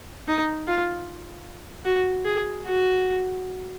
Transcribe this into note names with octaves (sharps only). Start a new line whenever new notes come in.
D#4
F4
F#4
G#4
F#4